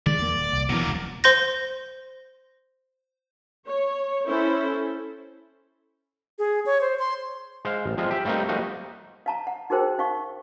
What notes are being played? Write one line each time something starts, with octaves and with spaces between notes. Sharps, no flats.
D3 D#3 G#3 D5
E2 A#3
D#1
C2
B2 D#3 E3 F#3 A#3
E1 C#2
C5 C6 G6 A#6
C#5
C#4 E4 A4 C5
G#4
C#5
C5
C6
G#3 C5 F5
A1
F3 G3 G#3 C4 F4
G4 E5
G3 A3 A#3 C4 D#4
F3 G3 A3 A#3 D#4 F#4
F5 A5 A#5
F#5
D#4 F#4 G#4 A#4 C5 G5
D#4 F5 C#6